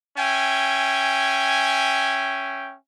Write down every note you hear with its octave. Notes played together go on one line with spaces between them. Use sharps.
C#4 E5 G5 G#5